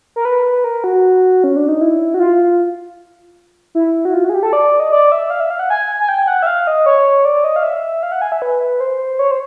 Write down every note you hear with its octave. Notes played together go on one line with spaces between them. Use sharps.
A#4
B4
A#4
F#4
C#4
D4
D#4
E4
F#4
F4
E4
F#4
F4
F#4
G#4
G4
A4
D5
D#5
D5
E5
F5
E5
F5
F#5
G#5
G#5
G5
F#5
E5
F5
D#5
C#5
D5
D#5
F5
E5
F5
F#5
G#5
E5
B4
C5
C#5
C5